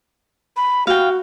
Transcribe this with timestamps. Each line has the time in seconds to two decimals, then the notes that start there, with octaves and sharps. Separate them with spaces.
0.56 B5
0.87 F#4 F5 G5